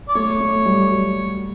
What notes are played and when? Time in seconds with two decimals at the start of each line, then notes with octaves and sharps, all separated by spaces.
0.08 D5
0.15 A3 C#5
0.40 A3
0.65 G3
0.90 F#3